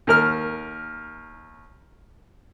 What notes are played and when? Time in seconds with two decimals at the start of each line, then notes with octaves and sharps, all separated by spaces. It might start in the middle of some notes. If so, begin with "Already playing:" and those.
0.07 D#2 A#4 F6